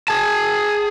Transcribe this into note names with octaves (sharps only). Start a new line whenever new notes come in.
G#4 A5